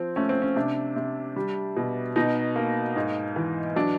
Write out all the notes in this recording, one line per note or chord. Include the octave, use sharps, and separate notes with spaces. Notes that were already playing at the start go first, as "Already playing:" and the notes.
Already playing: F3 C4
A3 C#4
C4
C#4
C3 D4
C3
G3
B2
B2 D#4
A#3
G#2
E3
F#3 D4